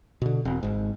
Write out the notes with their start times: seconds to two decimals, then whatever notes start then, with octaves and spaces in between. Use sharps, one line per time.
0.22 B2 D3
0.45 E1 C4
0.63 G#1 G#2